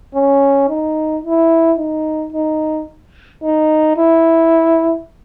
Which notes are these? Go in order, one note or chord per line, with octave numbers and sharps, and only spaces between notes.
C#4
D#4
E4
D#4
D#4
D#4
E4